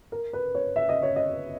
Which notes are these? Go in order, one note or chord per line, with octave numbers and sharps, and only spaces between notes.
A#4
B4
C#5
E5
D#5
C#5
D#5